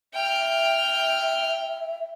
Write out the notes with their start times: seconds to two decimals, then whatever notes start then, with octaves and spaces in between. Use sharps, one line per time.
0.14 E5 G5 F6